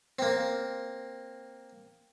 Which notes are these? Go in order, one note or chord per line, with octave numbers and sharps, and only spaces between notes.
A#3 C4